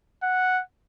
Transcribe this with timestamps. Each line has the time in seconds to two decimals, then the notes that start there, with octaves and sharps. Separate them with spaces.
0.23 F#5